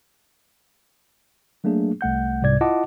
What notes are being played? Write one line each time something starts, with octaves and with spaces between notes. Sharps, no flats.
F#3 A3 A#3 D4 G#4
C2 A3 F#5 G6
C2 G#2 C3 D5 G#6
E4 F4 D#5 F#5 A5 D6